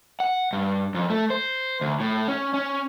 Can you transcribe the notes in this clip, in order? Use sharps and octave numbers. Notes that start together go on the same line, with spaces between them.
F#5
G2
F2
A3
C5
D2
A2
C#4
C#4